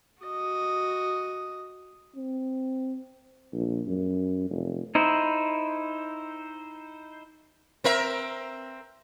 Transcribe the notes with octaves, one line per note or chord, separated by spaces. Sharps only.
F#4 D#5
C4
A#1
F#2
F1
D#4 E4 C5
C4 A#4 E5